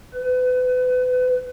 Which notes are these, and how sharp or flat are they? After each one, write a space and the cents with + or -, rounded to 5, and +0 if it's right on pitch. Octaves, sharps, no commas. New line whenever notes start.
B4 +35